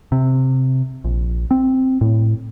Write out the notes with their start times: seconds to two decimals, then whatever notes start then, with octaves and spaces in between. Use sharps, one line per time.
0.12 C3
1.04 A#1
1.51 C4
2.01 A2